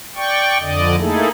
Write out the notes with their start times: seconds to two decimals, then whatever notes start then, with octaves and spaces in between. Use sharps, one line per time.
0.16 D5 G5 C#6
0.60 F2 D3 D5 D#5
0.98 A3 A#3 D#4 E4 G#4 A4